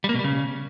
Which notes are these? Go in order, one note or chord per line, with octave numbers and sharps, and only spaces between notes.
G3
A#3
B2
G3
C#3